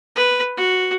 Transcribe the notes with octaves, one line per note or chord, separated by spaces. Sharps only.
B4
F#4